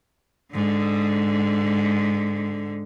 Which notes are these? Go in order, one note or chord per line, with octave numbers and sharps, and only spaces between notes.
G#2 D3